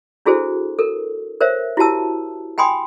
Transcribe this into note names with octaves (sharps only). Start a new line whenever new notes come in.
D4 E4 F#4 G#4 A4 C5
A4 A#4
A#4 C5 C#5 E5
E4 F#4 G4 A5 E6
G5 G#5 B5 C6 D#6